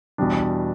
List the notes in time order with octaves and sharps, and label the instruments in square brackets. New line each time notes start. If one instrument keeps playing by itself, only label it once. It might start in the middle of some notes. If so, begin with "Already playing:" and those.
[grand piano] E2 B2 G3 D4